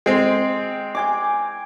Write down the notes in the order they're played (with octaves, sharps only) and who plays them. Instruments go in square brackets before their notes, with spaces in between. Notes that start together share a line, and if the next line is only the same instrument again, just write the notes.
[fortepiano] G#3 C4 [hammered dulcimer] G5
[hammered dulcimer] G5 G#5 D6